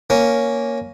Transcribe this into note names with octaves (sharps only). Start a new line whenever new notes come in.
A#3 C#4